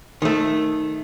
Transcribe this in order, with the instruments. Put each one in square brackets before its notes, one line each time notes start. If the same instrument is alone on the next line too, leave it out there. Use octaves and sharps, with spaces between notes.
[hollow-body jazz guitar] D#3 A3